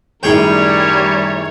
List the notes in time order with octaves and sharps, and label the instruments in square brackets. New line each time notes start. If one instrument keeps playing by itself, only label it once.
[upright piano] F#2 A2 D#3 [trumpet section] G3 [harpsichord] G#4 G5 [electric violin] A#4 C#5